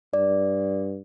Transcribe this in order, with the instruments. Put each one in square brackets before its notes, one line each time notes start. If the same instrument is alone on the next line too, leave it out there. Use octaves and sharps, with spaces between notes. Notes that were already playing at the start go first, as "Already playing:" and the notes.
[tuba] G2 [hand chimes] D5